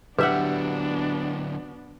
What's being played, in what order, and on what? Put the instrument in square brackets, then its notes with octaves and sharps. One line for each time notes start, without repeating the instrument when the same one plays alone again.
[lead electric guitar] D3 F#3 [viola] B3 D4 [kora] G4 E5 F#5 [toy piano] B4